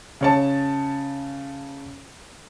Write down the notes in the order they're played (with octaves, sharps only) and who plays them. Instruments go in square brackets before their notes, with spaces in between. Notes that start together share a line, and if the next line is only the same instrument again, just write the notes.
[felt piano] C#3 C#5 A5